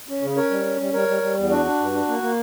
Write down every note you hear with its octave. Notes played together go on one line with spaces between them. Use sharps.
C#4
C#3
C#4 A#4 C#5
G3
C#4
G3
G3 A#4 C#5
G3
G3
E2
D4 F#4
D4
G2
D4
A#3
A#3